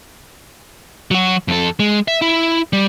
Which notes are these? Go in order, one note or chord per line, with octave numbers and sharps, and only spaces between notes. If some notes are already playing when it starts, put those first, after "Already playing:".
F#3 F#4
F2 A4
G#3
E5
E4
G3